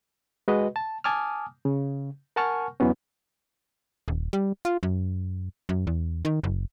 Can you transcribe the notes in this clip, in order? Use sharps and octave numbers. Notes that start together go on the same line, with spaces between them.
G#3 F#4 B4 D#5
A5
G#5 A5 D6 D#6 F6
C#3
A#4 F#5 G#5 A5 C#6 F6
E2 E3 F#3 B3 C#4
D#1
G3
F4
F#2
F#2
E2
D#3
F#1